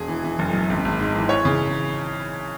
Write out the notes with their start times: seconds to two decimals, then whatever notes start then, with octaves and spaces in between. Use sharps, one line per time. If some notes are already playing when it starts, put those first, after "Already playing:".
Already playing: E1 G#4
0.08 E3
0.24 E3
0.39 F#1
0.53 F#2
0.70 G#1
0.85 G#1
0.99 G#2
1.15 E3
1.29 E3 C#5
1.45 C#3